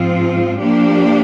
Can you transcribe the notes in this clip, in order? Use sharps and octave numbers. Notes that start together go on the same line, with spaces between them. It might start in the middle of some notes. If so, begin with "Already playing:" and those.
Already playing: G#2 F3 C4 F4
F3 A#3 D4 G4